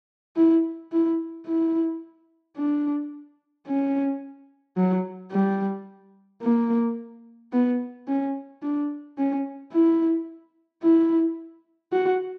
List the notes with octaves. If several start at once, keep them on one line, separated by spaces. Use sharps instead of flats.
E4
E4
E4
D4
C#4
F#3
G3
A#3
B3
C#4
D4
C#4
E4
E4
F#4